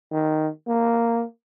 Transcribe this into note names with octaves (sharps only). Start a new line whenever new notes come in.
D#3
A#3